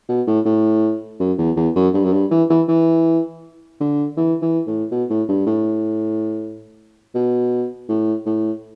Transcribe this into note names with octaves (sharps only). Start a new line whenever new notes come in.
B2
A2
A2
F#2
E2
E2
F#2
G2
F#2
G2
E3
E3
E3
D3
E3
E3
A2
B2
A2
G2
A2
B2
A2
A2